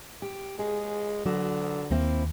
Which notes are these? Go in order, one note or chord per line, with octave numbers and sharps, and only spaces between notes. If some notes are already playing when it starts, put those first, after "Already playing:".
G4
G#3 G#4
D3 F#3 F#4 A#4
D#2 A#3 C4 E4